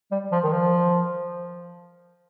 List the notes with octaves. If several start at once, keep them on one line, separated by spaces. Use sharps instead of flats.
G3
F3
D#3
F3